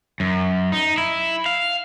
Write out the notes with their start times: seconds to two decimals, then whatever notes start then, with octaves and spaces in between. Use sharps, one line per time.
0.20 F#2
0.72 D#4
0.98 E4
1.46 F5